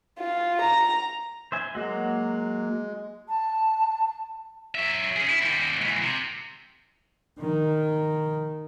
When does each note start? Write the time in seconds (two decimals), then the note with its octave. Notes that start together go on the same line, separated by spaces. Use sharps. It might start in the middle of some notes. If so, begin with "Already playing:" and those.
0.20 F4
0.62 A#5
1.52 C5 E5 G#5
1.75 F#3 G#3 A#3 F#4
3.28 A5
4.75 F#3 E5
5.16 C#4 G#4
5.29 E4
5.42 D#2 G3
5.81 G#2 E3
6.02 C3
7.39 D#3